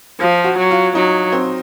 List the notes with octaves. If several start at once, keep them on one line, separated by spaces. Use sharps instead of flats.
F3 F4
F#4
F#3
F4
F#3 D#4
C4